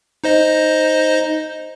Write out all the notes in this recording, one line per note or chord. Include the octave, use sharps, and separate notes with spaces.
D#4 C5 D#5